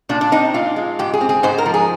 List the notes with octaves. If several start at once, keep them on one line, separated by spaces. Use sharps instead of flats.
A#2 D4
D4
C4 D#4
A#2 F4
G#3
G#2 G4
G#4
C4
G#4
G#2 C5
A#4
F3
G#4